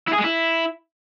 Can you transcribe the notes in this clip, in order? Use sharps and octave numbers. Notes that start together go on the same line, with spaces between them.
E4
G#4
G#3
E4